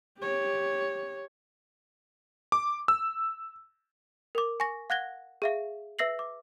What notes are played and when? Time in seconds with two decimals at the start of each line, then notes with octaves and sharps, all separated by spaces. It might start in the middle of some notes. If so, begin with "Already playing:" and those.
0.19 G4 C#5
2.52 D6
2.88 E6
4.35 A#4 D6
4.60 G#5 C#6 A#6
4.90 F5 F#5 F#6 G#6 A#6 G7
5.42 G#4 E5 F5
5.99 B4 E5 E6 A#6 C7 F#7
6.19 D6